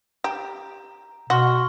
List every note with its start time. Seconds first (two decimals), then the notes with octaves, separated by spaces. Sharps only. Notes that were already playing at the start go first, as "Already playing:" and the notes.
0.24 G4 A#5
1.30 B2 F#4 C6 C#6 F6